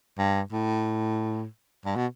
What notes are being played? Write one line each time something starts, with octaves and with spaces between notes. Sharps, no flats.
G2
A2
G2
B2